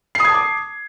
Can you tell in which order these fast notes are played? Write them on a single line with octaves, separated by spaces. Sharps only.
C7 D#6 G#6 A5 D6